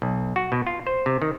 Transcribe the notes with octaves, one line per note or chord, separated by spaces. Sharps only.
B1
F#4
B2
F4
C5
C3
D#3